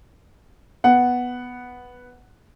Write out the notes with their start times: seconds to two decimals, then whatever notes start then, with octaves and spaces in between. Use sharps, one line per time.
0.84 B3 F#5